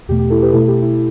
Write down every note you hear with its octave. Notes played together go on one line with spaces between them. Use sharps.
E2 B2 A3 G4
G4
E4 A4
G4 B4
B2 A3 E4 A4
G4
E4